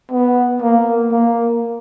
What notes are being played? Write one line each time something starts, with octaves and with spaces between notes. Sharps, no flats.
B3
A#3
A#3